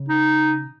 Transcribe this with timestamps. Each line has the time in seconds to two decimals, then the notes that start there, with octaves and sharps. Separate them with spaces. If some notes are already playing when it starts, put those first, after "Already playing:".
Already playing: C#3
0.08 D#4